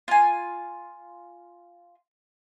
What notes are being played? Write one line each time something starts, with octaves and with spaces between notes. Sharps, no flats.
F4 G#5